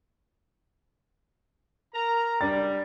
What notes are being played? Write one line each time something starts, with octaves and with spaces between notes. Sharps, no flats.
A#4 A#5
G3 D4 A6